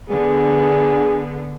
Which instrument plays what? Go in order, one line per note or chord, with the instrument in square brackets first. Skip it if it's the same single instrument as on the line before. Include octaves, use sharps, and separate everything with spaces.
[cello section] D3 B3 [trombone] G#4